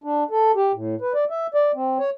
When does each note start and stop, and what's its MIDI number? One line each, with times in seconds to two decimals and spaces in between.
0.04 0.24 62
0.31 0.52 69
0.55 0.72 67
0.74 0.95 45
1.01 1.13 71
1.14 1.25 74
1.30 1.47 76
1.54 1.72 74
1.75 1.98 60
1.99 2.10 73